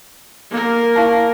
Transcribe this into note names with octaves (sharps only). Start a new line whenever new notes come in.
A#3 A#4
E4 F5 A5